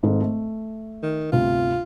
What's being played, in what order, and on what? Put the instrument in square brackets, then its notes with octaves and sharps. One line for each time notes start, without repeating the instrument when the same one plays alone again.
[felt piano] G#1 G#2 A4
A3
[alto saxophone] D#3
[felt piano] G1 D2 C3 [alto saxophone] F4